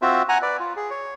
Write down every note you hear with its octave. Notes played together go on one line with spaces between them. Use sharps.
C4 F4 F#4 E5
F#5 G#5 A#5
B4 D5
F4
G#4
C#5